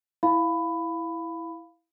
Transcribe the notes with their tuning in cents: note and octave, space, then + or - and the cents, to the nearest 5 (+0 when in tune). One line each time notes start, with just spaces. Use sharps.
E4 +0 F5 +0 B5 +15